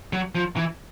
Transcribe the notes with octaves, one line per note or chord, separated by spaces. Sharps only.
F#3
F3
E3